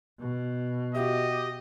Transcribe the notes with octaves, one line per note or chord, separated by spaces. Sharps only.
B2
F#4 G4 D#5 E5